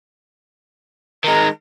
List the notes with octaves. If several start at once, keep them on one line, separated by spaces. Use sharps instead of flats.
D#3 G#3 A#5